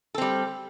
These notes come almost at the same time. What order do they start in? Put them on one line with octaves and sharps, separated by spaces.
A4 C4 G3